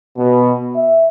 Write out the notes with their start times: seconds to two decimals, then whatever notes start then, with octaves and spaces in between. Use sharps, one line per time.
0.17 B2
0.76 E5